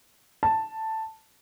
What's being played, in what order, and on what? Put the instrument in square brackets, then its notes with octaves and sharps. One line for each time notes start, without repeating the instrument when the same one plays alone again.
[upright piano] A5